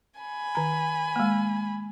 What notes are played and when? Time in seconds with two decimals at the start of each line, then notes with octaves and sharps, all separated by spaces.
0.20 G#5 B5
0.55 D#3 A#5
1.16 G#3 A#3